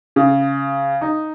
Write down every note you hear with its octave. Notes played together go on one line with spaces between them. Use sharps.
C#3
D#4